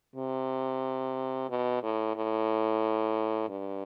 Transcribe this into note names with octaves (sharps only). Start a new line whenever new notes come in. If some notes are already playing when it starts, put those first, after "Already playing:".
C3
B2
A2
A2
G2